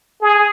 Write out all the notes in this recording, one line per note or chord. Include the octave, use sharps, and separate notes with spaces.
G#4